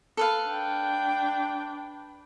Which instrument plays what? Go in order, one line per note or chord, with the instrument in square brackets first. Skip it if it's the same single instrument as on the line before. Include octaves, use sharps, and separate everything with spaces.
[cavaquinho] A4 B4 F5
[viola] D4 G5